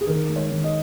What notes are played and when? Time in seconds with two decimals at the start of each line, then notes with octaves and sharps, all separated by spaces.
0.01 G#4
0.07 D#3 A#4
0.29 G#3
0.36 C#5
0.51 D#3
0.64 D#5